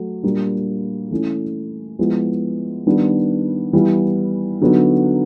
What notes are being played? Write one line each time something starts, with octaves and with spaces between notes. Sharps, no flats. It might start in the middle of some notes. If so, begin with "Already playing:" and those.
Already playing: F#3 A3
A#2 G3 A#3 D4
E3 A3 C#4 E4
F3 G#3 B3 E4
D#3 G3 B3 D4
E3 G3 B3 E4
D3 F#3 B3 D#4